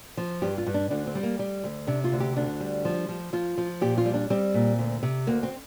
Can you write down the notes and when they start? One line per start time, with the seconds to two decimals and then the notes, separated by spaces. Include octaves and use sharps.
0.17 F3
0.42 G2 G4
0.58 F4
0.67 G2
0.74 D4
0.90 D2 D4
1.07 C4
1.15 G3
1.23 A#3
1.39 G3
1.64 D2
1.87 C3 D4
2.04 F4
2.12 D2
2.20 G4
2.36 D2 D4
2.60 G3
2.85 F3
3.09 F3
3.33 F3 F4
3.58 F3
3.81 A#2 G4
3.98 F4
4.06 G3
4.14 D4
4.30 G3 C4
4.54 A#2
4.79 D2
5.03 C3
5.27 D2 A#3
5.43 C4